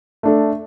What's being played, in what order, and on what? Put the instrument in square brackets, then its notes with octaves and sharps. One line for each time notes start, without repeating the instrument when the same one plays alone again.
[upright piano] A3 D4 A4